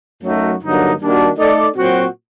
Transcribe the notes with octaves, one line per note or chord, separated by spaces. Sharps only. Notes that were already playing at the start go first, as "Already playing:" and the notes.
F#2 F#3 A3 D#4 F#4
G2 D3 F#3 A#3 D#4
D#3 G3 A#3 D4 F#4
A3 D#4 A4 D5
A#2 F#3 C4 F#4